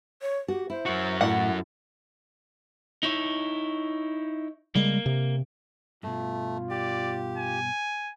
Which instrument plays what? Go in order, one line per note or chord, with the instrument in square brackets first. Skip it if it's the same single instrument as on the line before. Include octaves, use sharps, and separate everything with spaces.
[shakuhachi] C#5
[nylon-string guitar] F#4 [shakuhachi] G4
[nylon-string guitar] E4 [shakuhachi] C5
[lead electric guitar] F#2 F#4
[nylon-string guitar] A2 [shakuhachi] E4 [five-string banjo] F#5
[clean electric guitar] D#4 E4 C#5
[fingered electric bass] C#3 G3 G#3 [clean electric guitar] A#3
[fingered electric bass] C3
[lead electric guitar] G2 B2 [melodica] A3 [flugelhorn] F4
[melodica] G4 [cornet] D5
[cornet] G#5